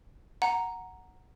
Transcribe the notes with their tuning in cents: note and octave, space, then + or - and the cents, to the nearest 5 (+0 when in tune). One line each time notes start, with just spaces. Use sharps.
F#5 +0 A#5 +0